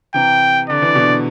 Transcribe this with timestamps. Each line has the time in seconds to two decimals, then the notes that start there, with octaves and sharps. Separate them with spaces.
0.14 C3 E3 G5
0.69 D3 D5
0.82 E3
0.95 B2 D3